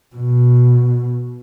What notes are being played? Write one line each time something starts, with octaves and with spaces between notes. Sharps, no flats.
B2